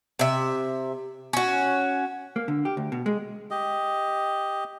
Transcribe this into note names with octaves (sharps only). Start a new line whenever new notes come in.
C3 E5
C#4 F#4
A#3
D3
G4
D2
B2
G#3
G4 D#5